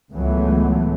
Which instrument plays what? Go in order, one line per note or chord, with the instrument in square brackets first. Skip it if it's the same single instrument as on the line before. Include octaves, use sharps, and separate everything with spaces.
[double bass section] C#2 A2 E3 F#3 A3 B3